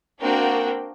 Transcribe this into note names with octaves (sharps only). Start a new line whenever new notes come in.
A#3 C4 D4 F#4 A#4 G5